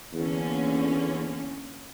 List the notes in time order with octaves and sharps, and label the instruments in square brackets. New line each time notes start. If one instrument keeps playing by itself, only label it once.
[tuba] E2 [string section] D3 A#3 C#4